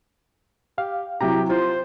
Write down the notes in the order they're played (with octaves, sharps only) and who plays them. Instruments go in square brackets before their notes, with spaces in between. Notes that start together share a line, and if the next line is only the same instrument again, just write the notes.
[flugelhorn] G4 [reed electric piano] F5
[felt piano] C3 F#3 [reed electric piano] E4 A#5 [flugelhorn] G4
[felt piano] F4 [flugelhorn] C5